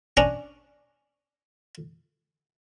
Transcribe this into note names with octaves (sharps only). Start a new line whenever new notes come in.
C#4 D4 C#5 G#5 A#5